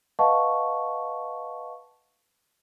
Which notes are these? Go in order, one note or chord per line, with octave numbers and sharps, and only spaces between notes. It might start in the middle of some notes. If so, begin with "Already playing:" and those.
B4 D#5 F5 F#5 A5 C#6